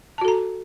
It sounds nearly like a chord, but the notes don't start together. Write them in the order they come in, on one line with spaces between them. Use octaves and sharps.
A5 F#4 A4 A#5